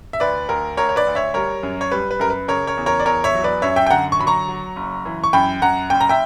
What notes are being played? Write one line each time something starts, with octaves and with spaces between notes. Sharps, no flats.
E5
D2 B4 D5
D2 A#4
D2 A#4 C#5
C#5
B4 D5
D2
C#5 E5
G3 A#4 C#5
F#2
C#5
G3 B4
B4
F#2 A#4
B4
C#3 A#4 C#5
A#4 C#5
E2
A#4 C#5
D5
E2 A#4 C#5
C#5 E5
F#3
B4 D5
F#2 C#5 E5
E5 G5
G5
D3 F#5 A#5
C#6
F#3 B5
A#5 C#6
F#3
F#1
E3
C#6
F#2 G5 B5
F#2 F#5 A#5
F#1 G5
A#5
E5 G5